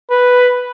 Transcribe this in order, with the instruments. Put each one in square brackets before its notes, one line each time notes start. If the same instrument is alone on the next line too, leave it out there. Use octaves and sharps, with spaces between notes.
[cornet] B4